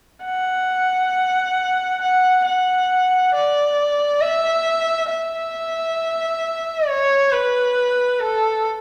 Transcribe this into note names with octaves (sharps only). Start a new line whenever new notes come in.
F#5
F#5
F#5
D5
E5
E5
C#5
B4
A4